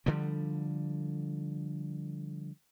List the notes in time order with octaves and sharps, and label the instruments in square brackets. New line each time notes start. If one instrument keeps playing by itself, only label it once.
[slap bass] D3 F3 G3